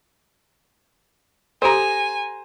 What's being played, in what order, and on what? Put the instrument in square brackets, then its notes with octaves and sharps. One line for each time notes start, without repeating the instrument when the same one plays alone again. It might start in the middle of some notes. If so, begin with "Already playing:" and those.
[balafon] G4 A4 [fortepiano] C5 A#5 [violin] G#5